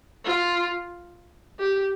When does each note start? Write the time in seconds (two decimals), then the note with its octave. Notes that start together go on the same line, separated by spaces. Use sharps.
0.25 F4
1.59 G4